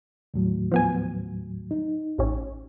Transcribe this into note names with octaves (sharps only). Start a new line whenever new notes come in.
D#2 A2 F#3
F3 B3 G#5
D#4
A1 C#4